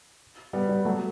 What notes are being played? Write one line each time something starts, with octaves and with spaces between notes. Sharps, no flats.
G3 B3
G3
F#3 A3